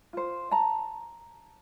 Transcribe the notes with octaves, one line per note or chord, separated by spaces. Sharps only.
F4 C5
A5 A#5